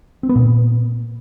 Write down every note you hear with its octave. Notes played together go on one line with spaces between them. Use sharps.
C4
B3
A#2